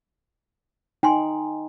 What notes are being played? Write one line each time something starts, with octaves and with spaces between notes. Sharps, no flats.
D#4 G5 G#5 C6